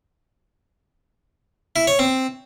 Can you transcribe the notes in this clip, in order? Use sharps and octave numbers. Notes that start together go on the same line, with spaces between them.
E4
C#5
C4